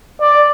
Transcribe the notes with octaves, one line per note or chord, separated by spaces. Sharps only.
D5